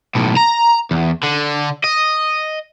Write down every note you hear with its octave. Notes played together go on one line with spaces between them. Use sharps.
B1 A2
A#5
E2
D3
D#5